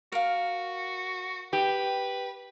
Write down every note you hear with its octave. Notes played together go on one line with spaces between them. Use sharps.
F#4 A#4 F5
G4 B4